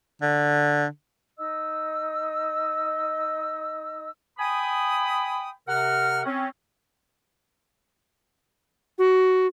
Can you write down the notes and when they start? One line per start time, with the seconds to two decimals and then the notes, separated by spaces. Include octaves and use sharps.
0.22 D3
1.38 D#4 D#5 E6
4.38 G5 G#5 B5 D#6
5.67 C3 A#4 F#5 F6
6.25 C4 C#4
8.98 F#4